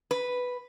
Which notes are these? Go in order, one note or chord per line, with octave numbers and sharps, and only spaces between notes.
B4